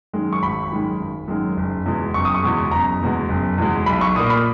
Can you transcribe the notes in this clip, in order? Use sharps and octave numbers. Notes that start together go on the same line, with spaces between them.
F#2 D#3 G#3
C#6
G#1 B5
F#2 D#3 G#3
G#1
F#2 D#3 G#3
F#1
E2 B2 G#3
F#1 C#6
D#6
C#6
E2 B2 G#3
F#1 A#5
E2 B2 G#3
F#1
E2 B2 G#3
B1 B5
C#6
A#2 A#3 D#6
B5